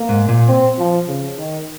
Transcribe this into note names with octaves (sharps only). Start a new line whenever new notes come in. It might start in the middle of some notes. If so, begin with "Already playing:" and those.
Already playing: A#3
G#2
A#2
C4
F3
C#3
D#3